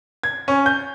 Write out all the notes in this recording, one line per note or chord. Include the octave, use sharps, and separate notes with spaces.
G#6
C#4
G6